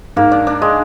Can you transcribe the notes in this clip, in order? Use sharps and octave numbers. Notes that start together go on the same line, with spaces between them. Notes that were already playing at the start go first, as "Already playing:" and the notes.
G#2 A#3
D4
D4
G#3